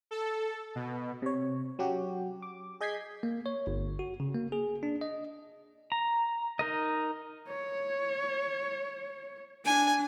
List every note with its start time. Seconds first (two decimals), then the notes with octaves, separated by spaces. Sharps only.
0.11 A4
0.75 B2
1.22 C3 C#5
1.79 F#3 C#4 F#4 G4
2.42 D6
2.81 G#4 D#5 G6 G#6 B6 C7
3.23 A#3
3.46 C#5
3.67 G1
3.99 F#4
4.20 C#3
4.35 A#3
4.52 G#4
4.83 D4
5.01 D#5
5.92 A#5
6.59 D#4 A#4 D#5
7.48 C#5
9.65 D4 G#5